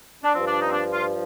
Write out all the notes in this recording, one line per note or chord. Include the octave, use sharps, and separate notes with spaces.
D4
G2 F3 C4
D4
D#4
C4
D4
F4